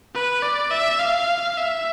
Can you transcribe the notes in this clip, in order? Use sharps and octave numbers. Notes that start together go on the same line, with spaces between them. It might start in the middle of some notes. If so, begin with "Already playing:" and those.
B4
D5
E5
F5
E5